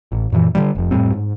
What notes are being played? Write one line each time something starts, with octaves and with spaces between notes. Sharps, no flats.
A1
F#2 A#2 D#3 E3
D3 D#3 G3
F1 F2
F2 A2 G3 C4
G#2